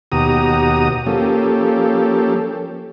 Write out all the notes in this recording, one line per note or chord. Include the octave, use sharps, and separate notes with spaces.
D#2 B2 F#4 G4 A#5 D#6
F3 A#3 C#4 G4 A4